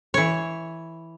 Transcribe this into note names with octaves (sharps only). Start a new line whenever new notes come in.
E3 C#5